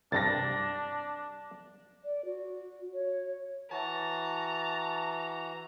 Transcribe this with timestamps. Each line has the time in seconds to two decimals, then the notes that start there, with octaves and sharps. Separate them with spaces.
0.12 C2 G2 D4 A6 A#6
2.04 D5
2.25 F#4
2.94 C#5
3.71 E3 F#4 A5 A#5